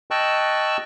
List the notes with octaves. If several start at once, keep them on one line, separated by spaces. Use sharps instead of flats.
D#5 G5 A5 C#6 E6 F#6